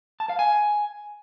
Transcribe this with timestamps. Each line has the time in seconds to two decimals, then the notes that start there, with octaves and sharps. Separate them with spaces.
0.20 A5
0.29 F5
0.39 G#5